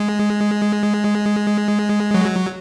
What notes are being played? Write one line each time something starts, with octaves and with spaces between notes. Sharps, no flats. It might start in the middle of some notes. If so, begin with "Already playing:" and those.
Already playing: G#3
F#3